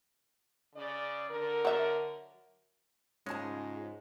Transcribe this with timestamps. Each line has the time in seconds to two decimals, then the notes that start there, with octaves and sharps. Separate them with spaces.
0.75 C#3 D5
1.29 D3 A#4
1.65 F#3 E5
3.26 G#2 C#3 G#3 C#4 F4 G#4 A5